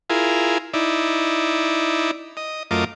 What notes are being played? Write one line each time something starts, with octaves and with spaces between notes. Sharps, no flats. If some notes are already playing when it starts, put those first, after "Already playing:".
E4 F4 G#4 A#4
D#4 E4 D5
D#5
F#2 A3 F4 A#4 D#5 D6